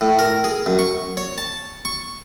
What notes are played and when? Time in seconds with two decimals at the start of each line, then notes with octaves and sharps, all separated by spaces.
0.01 A2
0.19 A#4
0.44 G#4
0.66 F#2
0.79 C#6
1.17 C#5
1.38 A5
1.85 C#6